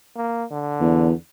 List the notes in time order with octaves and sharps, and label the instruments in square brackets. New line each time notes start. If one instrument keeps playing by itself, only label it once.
[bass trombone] A#3
D3
[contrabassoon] E2